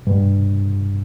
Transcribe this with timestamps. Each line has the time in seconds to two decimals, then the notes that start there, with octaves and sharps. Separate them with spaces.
0.07 G2